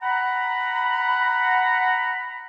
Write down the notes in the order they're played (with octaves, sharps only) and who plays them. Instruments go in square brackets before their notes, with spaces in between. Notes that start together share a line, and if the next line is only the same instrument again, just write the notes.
[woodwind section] F#5 A#5 B5